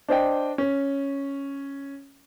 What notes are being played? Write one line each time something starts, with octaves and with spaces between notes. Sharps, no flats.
D4 C5 D#5 G5
C#4